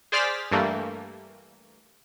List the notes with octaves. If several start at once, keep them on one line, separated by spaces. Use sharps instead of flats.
G#4 C5 D5 F6 A6 B6
G2 E3 G3 A3 A#3